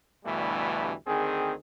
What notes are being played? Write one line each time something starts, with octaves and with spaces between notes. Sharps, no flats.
D2 G2 B2 E3 G3 A3
D2 D#3 C4 G#4